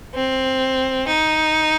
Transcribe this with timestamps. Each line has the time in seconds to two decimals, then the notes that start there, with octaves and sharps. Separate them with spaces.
0.15 C4
1.07 D#4